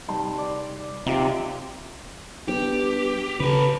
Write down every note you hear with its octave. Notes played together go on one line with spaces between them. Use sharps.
C3 G3 D#4 A5 C6
D5
C3 D#4 F4 G4
G3 B3 D4 G4
C#3 A4 B4